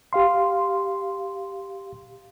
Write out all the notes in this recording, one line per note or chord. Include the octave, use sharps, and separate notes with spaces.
G4 F5 C6